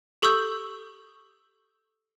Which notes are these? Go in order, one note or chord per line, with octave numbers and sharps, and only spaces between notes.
G4 A4 C#6 D#6 E6 G6